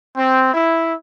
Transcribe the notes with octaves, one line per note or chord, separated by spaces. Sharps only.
C4
E4